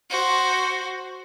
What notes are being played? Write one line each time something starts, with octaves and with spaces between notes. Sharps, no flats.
F#4 C5